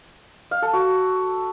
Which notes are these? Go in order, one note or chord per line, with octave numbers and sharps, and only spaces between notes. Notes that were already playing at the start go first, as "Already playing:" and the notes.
F5
A4
F#4